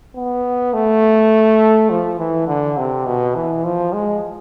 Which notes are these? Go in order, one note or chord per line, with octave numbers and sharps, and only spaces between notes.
B3
A3
F3
E3
D3
C3
B2
E3
F3
G#3